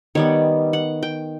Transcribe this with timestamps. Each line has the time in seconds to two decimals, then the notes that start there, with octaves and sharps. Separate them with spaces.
0.15 D#3 G3 B3 C#5
0.73 F#5
1.03 G5